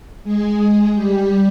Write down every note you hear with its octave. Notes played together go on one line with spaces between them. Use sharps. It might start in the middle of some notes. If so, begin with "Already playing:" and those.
G#3 G#4
G3 G4